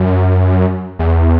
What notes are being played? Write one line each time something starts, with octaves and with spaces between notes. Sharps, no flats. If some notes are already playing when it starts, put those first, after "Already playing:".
Already playing: F#2
E2